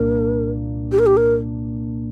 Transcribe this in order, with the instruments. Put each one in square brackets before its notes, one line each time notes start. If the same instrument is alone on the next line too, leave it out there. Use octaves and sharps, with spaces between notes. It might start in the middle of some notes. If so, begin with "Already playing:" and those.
Already playing: [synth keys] C2 A#2 A#3 D4 [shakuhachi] A#4
[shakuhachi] G4
A#4
G4
A#4